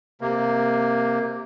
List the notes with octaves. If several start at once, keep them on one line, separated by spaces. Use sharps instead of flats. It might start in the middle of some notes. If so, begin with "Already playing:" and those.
C3 A#3